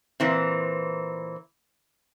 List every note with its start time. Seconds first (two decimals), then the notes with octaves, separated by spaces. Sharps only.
0.20 A#2 E3 C4